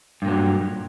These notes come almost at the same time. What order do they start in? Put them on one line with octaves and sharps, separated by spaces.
G2 A#2 F#3